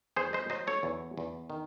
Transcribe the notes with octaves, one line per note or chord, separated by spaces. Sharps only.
E2 G#4 C5
C5 D#5
F#3 C5 D#5
A4 C#5
E2
E2
D#3